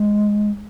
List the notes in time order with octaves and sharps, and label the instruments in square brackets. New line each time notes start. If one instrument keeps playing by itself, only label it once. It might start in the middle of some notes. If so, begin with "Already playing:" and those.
Already playing: [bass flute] G#3